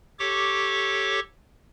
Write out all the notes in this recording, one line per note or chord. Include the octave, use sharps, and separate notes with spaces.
G4 A4 C#5 C#6 D6